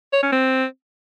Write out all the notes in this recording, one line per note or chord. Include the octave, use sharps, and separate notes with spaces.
C#5
C#4
C4